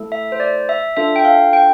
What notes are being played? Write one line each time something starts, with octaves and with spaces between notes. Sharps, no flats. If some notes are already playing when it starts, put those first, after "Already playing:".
Already playing: A3 E4 A4
E5
C5
D5
E5
D4 F4 A4 E5
G5
F5
G5